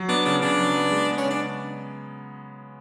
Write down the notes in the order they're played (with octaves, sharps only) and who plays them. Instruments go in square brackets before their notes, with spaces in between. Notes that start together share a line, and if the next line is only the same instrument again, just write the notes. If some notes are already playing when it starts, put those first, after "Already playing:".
Already playing: [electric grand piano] F#3
[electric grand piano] B3 [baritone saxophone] D4
[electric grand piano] C#3 [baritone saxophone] D4
[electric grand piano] C#3 [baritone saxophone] D4
[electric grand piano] F#3
B3
G#3
B3
[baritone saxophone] C#4
[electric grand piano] C#3 [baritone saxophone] D4